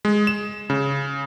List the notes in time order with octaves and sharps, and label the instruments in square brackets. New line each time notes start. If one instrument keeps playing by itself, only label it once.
[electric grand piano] G#3
E7
C#3